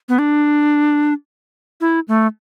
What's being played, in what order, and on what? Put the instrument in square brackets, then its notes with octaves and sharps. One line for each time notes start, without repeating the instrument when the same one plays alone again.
[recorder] B3
D4
E4
A3